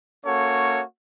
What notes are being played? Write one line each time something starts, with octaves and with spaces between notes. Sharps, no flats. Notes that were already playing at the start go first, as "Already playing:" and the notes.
A#3 C#4 F#4 A4 C#5